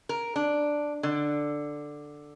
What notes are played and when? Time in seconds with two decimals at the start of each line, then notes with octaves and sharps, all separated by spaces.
0.09 A#4
0.36 D4
1.03 D3